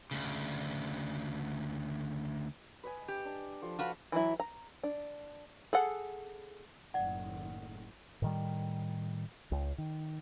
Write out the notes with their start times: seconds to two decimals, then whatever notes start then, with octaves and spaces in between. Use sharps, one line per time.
0.11 D2 C#3
2.84 B4 D#5 G#5
3.08 G4
3.25 D4
3.62 F3 A4
3.79 F4 F#4 B4
4.12 E3 F#3 E4
4.40 A#5
4.83 D4
5.73 G#4 A4 F#5
6.94 F#1 A2 D#3 D5 F#5
8.22 A2 D#3 G3
9.52 C#2
9.78 D#3